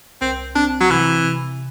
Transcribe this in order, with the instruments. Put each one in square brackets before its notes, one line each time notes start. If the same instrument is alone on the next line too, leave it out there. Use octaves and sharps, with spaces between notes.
[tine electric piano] C2 [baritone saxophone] C4
[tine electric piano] C4 [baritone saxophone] D4
[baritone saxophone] F#3
[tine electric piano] C3 [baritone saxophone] E3
[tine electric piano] C3